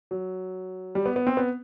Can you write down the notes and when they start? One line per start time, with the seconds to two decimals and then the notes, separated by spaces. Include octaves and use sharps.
0.11 F#3
0.95 G3
1.06 B3
1.16 B3
1.27 C4
1.37 B3